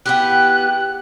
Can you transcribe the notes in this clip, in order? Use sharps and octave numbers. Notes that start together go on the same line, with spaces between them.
B3 E4 G4 F#6